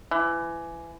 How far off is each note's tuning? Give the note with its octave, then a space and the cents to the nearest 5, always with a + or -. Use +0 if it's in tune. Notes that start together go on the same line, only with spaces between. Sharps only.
E3 +25